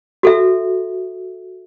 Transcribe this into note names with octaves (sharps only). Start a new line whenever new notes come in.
F#4 A4 E5